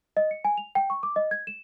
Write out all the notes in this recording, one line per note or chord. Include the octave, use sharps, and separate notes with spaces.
D#5
C#7
G#5
F7
G5
C#6
D6
D#5
G#6
E7